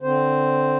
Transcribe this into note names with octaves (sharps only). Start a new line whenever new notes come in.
D3 C4 C5